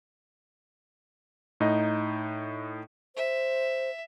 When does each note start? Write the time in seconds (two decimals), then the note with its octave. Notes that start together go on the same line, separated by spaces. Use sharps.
1.60 A2 D#4 D#5
3.16 C5 E5